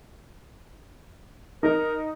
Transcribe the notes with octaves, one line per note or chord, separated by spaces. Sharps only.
D#4 A#4